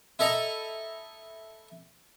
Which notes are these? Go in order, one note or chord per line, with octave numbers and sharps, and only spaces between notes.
E4 A4 D#5 A#5